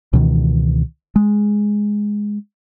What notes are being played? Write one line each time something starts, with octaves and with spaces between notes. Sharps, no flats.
C#2 B2 D#3 E3
G#3